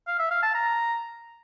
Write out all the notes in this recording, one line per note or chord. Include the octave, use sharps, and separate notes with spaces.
F5
E5
F5
A5
A#5